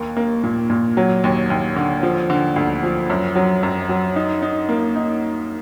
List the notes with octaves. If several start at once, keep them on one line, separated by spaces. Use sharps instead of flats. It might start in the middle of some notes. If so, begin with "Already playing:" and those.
Already playing: D#2 A#3
A#3
A#2
A#2
F#3
D#2
D#2
D3
F3
D3
D2
F3
F#2
F#3
F#2
F#3
D#4
D#4
A#3
D#4